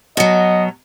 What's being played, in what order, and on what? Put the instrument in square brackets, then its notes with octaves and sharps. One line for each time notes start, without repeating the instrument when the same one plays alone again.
[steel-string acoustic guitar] B2 F#3 [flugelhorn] D#5